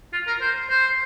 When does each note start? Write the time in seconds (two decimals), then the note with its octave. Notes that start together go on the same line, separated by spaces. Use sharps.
0.13 F4
0.27 A#4
0.41 C5
0.70 C5